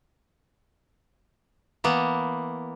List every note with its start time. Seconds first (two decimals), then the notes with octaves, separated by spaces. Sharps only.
1.84 E3 A#3 B3